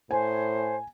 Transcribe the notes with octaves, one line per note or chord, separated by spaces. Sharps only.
A2 C5 G#5